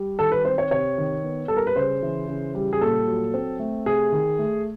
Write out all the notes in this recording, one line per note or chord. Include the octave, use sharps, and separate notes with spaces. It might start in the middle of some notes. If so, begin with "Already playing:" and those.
Already playing: G3
D#3 A4
B4
C4 C5
C#5
C3 C#5
D#3
B3
G3 A4
A#4
B4
C#3 C5
E3
C#3
G3
G#4
A#2 A4
F#3
C4
A3
C3 G#4
D#3
A3